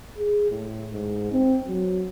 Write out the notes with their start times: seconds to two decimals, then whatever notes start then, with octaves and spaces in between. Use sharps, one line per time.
0.17 G#4
0.50 A2
0.92 G#2
1.32 C4
1.67 F#3